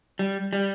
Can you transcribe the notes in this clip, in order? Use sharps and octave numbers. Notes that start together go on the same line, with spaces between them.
G3
G3